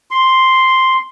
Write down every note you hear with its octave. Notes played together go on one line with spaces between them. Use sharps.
C6